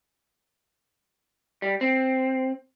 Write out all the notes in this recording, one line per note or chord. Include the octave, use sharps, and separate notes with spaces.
G3
C4